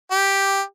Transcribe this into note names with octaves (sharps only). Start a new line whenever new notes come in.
G4